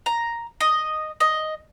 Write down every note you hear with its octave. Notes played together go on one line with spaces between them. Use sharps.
A#5
D#5
D#5